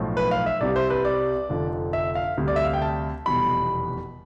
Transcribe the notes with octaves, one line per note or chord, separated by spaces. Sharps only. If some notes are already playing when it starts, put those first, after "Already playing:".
Already playing: B1 A2 F3
B4
F5
E5
C2 C3 G3 D5
C5
B4
D5
F1 F2 D3 F3
E5
F5
D2 C3 G3
D5
E5
F5
G5
A5
F1 E2 B2 G3 B5